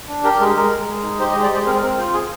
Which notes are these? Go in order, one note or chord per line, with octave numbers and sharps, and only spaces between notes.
D4
G4 A#4
G#3 A#4
G#3 A#4
G#3
G#3
D#4
G4 C5
D#5
G#3
D5
G#3 C5
C4 A#4
C4 A#4
F4 C5
G#4